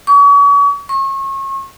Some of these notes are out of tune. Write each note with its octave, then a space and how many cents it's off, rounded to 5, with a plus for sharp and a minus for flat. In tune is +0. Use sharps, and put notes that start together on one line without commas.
C#6 +40
C#6 -35